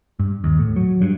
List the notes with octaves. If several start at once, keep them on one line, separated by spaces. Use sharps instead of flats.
G2
D#2
A2
F#3
G2